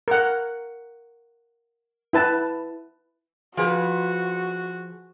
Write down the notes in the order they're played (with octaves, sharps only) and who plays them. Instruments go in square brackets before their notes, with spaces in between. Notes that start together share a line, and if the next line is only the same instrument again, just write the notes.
[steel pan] A#4 F#5
E4 B4 A5
[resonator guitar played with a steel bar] F3 G#4 B4 [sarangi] F#4